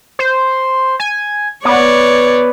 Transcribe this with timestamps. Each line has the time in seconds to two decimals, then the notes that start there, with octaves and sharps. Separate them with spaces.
0.19 C5
1.00 G#5
1.65 B3 C#5 D5